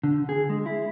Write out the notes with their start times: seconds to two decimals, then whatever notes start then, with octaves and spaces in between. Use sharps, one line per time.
0.04 D3
0.29 G#4
0.49 G#3
0.66 E4